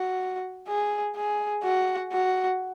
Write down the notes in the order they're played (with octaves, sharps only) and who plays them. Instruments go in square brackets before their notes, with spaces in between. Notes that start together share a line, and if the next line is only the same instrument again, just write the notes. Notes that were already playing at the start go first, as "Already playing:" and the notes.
Already playing: [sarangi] F#4
G#4
G#4
F#4
F#4